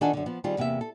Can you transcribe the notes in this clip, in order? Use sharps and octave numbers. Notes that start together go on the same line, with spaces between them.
D#3 D4 F4 A4 F#5 G#5
F#2 D3
F3 B3
D#3 G3 C4 F4 G#4
E2 C3 A#3 B3 E5
A4